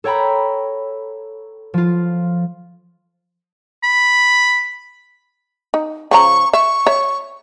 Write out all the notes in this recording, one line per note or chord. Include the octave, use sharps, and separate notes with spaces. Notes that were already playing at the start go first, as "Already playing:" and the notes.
A4 C#5 G5 A#5 B5
F3 F4
B5
D#4
C#3 F3 A#5 C#6
E5 C#6
C#5 E5